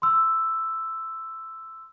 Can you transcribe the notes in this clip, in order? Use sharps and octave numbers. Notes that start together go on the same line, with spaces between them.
C6 E6